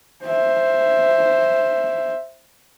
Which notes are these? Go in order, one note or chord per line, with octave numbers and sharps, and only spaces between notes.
C5 E5